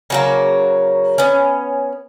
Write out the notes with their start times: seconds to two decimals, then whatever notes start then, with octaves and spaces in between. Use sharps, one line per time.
0.10 C#3 F#3 A#3
1.18 B3 C#4